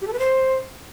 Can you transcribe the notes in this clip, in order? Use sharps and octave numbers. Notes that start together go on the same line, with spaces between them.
G4
A4
B4
C5